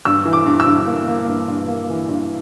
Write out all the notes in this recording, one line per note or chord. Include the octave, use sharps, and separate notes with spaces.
G2 E6
E3
D6
G2
E6
G2
A#3
A#3
G2
G2
A#3
E3
G2